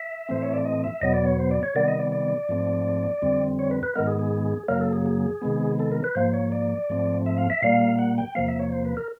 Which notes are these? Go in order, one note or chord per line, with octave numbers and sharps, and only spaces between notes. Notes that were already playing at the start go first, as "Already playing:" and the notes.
Already playing: E5
A2 E3 A3 C4 C5
C#5
D5
D#5
E5
E2 B2 F#3 B3 D#5
D5
C#5
C5
D5
C#5
C3 D#3 G3 B3 D5
D#5
D5
D5
G#2 F3 A3 C4
F2 D3 G3 C4
C#5
B4
B4
G#2 D#3 G#3 B3 A#4
G#4
G#4
F#2 C#3 F#3 A#3 A#4
A4
G#4
G#4
C3 D#3 G#3 B3
A4
A#4
B4
G#2 F3 A#3 C5
C#5
D5
G#2 F3 A3 C4
E5
F5
E5
A#2 G3 A#3 F5
F#5
G5
E2 C3 F3 A#3 F5
E5
C#5
C5
B4
A#4